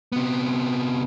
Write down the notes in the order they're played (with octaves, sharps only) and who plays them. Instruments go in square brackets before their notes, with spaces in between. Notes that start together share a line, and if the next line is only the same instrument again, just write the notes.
[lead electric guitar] C3 B3